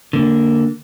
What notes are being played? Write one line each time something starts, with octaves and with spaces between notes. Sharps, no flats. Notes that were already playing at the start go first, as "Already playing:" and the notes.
D3 A#3